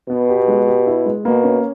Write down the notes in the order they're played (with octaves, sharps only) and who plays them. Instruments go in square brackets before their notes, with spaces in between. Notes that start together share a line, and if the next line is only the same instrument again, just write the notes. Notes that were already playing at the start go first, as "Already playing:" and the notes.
[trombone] B2 [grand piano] B3
[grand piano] G4
G#3
G4
E4
G#3
[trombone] B2 [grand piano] A#3
[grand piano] C#4